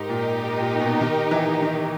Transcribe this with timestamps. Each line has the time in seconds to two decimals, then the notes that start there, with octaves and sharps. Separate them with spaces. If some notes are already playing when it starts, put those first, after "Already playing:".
Already playing: G#2 D#4 G4 A#4
0.09 A#2
0.60 A#2
0.80 B2
1.01 D#3
1.31 E3
1.62 D#3